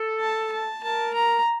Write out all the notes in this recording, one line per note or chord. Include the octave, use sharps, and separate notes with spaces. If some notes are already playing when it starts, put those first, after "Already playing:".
Already playing: A4
A5
A5
A#4 A5
A#5